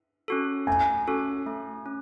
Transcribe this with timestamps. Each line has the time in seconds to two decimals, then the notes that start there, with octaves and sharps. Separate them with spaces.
0.28 C#4 F#4 A4
0.67 A3 G#5
1.07 C#4 F#4 A4
1.46 A3
1.86 C#4